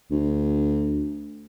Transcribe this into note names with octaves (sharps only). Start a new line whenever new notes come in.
D2